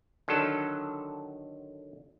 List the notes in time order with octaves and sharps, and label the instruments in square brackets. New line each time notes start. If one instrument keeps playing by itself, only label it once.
[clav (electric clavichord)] D3 D#3 F#3 A4